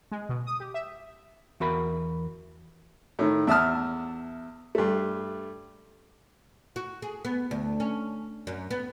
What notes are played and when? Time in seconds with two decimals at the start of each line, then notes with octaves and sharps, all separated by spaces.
0.12 G#3
0.29 B2
0.47 D#6
0.60 G4
0.74 E5
1.60 E2 F#4 A#4 B5
3.19 A2 D#3
3.47 E2 E5 A5 D#6 F6
4.75 G2 A3
6.76 F#4
7.02 G#4
7.25 B3
7.51 D2
7.80 C#4
8.47 F#2
8.70 B3